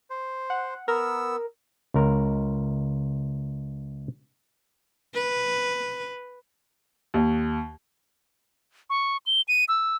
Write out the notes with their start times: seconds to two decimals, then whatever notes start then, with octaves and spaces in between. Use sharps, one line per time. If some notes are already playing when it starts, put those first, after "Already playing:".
0.10 C5
0.50 F#5
0.88 B3 A#4 E6
1.94 C#2 A#4
5.14 B4
7.14 D#2
8.90 C#6
9.26 G7
9.48 D#7
9.68 E6